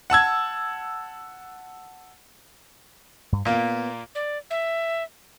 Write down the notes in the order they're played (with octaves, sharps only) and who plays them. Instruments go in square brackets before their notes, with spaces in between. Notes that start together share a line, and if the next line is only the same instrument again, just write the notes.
[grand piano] F#5 A5 E6 G#6
[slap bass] G2
[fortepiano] A#2 A#3 [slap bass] B3
[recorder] D5
E5